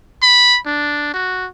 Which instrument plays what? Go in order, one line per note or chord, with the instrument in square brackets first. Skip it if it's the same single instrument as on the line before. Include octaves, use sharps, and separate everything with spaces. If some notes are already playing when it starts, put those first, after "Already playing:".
[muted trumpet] B5
D4
F#4